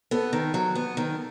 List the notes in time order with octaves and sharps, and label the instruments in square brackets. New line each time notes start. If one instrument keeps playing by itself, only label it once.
[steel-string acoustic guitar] B3 [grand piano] A4
[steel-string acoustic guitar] D#3
F#3
B3
D#3